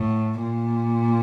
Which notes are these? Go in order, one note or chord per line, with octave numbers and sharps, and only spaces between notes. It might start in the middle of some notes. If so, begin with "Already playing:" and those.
Already playing: A2
A#2